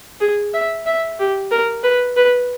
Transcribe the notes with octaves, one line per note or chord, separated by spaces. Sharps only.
G#4
E5
E5
G4
A#4
B4
B4